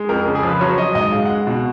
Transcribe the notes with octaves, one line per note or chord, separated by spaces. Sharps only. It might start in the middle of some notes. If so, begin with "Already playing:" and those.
Already playing: G#3
F2 A#4
C#3
G#4
F3 B4
F#3 C#5
F#3 D#5
G#2 D#5
G#3 F5
G#3 F#5
B2 F#5